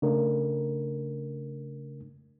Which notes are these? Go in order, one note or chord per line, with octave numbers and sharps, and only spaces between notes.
C#3 A3 D4 A#4